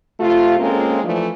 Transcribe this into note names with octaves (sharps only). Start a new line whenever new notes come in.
C3 A3 F4
G#3 A#3 C4 C#4 A4
E3 F3 A3 D4